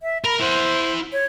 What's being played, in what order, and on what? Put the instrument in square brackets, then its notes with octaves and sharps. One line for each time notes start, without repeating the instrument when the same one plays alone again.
[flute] E5
[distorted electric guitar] A#4 [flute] B5
[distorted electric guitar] E4 F#5 [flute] C5
[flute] C#5